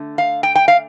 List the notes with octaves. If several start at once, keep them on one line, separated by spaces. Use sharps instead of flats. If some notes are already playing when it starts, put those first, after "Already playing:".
Already playing: D3 A3 D4
F5
G5
G5
F5